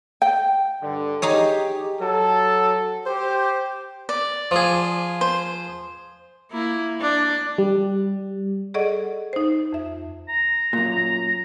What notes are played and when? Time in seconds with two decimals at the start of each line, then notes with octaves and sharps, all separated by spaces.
0.22 G5
0.82 G2 D3
1.22 D#4 G4 G#4 C#5
2.01 F#3 A4
3.06 G4 C5
4.09 D5
4.51 F3 G#4
5.21 C5
6.51 A#3 E4
7.00 D4
7.58 G3
8.74 G#4 A4 D5 D#5 F#5 C#6
9.33 D#4 C5
9.73 F2 E5
10.29 A#5
10.73 F#2 A#2